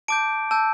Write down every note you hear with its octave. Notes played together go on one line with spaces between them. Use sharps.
A5 D6 G6 D7
A5 E6 G6